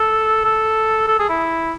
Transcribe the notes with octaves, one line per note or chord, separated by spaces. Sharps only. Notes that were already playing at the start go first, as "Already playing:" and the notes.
Already playing: A4
A4
A4
G#4
E4